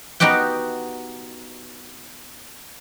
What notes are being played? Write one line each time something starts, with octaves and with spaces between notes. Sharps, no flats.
B3 D#4 F#4 G4 G5